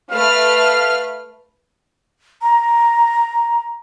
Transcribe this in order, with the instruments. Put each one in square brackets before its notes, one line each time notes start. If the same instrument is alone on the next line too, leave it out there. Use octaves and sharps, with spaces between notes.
[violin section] A3 B4 F6 [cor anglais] F5
[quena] A#5